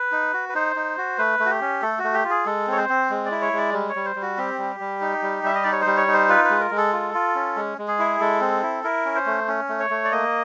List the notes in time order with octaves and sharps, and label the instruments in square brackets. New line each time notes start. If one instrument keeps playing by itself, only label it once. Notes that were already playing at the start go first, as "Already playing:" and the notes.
Already playing: [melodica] B4
D#4
F#4
B4
D#4 C5
D#4
F#4
A3 B4
A3
F#4
G4
C#4
A3 A4
F#4
A3
G4
F4
G#4
G#3 A4
C4 C#5
C5
C4
G#3
D5
E4
C#5
G#3 D5
G3
C#5
G3
C5
G3
F#4
C4 G4
G3
G3
D#4
G3
G3 E5
D#5
D#4 D5
C#5
C5
G3
C#5
D#4
C5
F4 B4
B4
G#3
A#4
G#3
A4
F4
F4
C#4
G#3
G#3
G#4
E4
G#3 A4
C4
E4
E4 A#4
C#4
C5
A3
C#4
A3
C#5
A3
D5
A#3 D#5